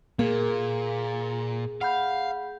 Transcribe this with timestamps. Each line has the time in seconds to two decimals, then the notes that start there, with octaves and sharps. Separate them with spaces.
0.19 A#2 A#3 G#4
1.81 F5 F#5 B5 G6